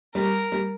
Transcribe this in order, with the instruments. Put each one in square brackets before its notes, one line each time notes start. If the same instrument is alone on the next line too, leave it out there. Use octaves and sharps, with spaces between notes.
[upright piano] G3 [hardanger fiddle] A#4
[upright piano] G3